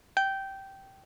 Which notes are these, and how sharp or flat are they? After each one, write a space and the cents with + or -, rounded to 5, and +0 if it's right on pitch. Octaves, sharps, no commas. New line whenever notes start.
G5 -15